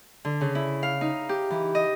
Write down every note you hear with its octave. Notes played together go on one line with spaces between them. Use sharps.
D3
C#3
E4
F5
D#4
G4
E3
D#5